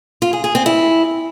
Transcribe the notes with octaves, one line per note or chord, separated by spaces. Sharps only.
F4
G#4
G#4
C4
E4